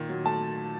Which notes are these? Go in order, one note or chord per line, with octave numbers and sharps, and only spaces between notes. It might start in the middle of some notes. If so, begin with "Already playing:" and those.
Already playing: A#2 D#3
F#3
A3 A5